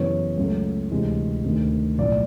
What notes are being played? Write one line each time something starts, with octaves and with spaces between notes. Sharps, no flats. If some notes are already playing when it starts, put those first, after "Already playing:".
Already playing: F#2 C#3 E3 G3 B3 C#5
C#2 C#3 F#3 A3
D2 C3 E3 G#3
D2 C3 D#3
B1 A2 F3 D5